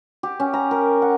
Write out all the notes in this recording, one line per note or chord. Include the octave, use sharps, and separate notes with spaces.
G4
C#4
A#5
A#4
F#5